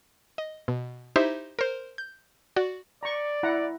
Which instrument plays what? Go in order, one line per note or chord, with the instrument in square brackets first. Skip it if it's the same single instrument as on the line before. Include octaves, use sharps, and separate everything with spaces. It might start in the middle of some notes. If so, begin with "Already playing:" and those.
[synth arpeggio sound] D#5
B2
D#4 E4 G4 C5 E5
A#4 C5
G6
F#4 D5
[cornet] D5 [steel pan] A#5 C#6
[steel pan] E4 F#5 A#5